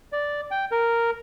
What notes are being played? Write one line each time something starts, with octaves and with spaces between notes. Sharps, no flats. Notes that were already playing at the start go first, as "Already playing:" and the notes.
D5
G5
A#4